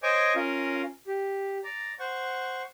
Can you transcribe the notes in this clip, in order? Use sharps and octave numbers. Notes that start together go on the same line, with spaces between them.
C5 C#5 D#5 G#5 C#6 D6
C#4 F4 A#4
G4
D5 A#5
C5 F#5 C#6